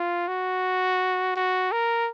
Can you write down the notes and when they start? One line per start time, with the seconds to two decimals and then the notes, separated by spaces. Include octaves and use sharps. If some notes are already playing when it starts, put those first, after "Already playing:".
Already playing: F4
0.28 F#4
1.36 F#4
1.72 A#4